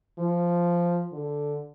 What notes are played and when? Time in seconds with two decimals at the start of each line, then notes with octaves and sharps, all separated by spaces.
0.19 F3
1.13 D3